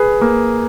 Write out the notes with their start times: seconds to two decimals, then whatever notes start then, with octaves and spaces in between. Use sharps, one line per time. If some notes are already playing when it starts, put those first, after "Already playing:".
Already playing: G#4 B4
0.21 A#3